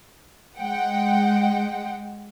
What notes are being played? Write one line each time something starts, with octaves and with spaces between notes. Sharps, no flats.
G#3 F#5 G5